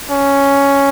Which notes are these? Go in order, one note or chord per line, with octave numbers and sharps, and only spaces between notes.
C#4